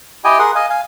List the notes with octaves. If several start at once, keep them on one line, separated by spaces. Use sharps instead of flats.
E4 G4 D#5 G5 G#5
G#4 A#4 F#5 C6 D#6
D#5 F5 G#5
F5 G#5